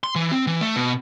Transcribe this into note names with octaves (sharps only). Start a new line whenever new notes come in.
C6
E3
C4
E3
A3
B2